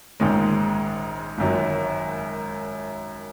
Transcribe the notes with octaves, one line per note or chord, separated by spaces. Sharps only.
A#1 G#2 D#3 G#3 C#4
G#1 F#2 D#3 F#3